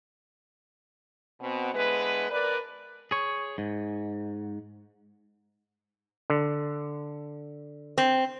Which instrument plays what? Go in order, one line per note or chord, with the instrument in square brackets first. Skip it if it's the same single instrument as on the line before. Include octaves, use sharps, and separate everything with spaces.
[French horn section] B2 B3 C4
D3 G#3 B3 E4 B4
F2 A#4 B4 D5
[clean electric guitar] G#4 C#5
G#2
[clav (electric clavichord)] D3
[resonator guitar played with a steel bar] C4